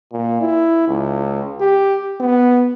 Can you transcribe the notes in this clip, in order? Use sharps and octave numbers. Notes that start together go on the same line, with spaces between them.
A#2
E4
C#2
G4
B3